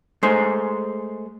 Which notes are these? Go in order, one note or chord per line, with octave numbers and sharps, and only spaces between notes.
G#3 A3 C5